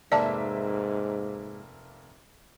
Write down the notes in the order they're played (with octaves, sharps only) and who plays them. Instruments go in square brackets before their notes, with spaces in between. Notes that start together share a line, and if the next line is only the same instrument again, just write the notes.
[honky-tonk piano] F1 A#3 E5 [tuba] G#2 [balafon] D5 A5